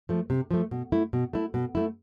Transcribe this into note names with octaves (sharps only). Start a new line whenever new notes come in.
F3 A3
C3
F3 A3
B2
A3 E4
B2
A3 E4
B2
A3 E4